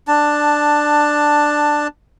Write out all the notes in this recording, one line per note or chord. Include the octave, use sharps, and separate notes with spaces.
D4 A5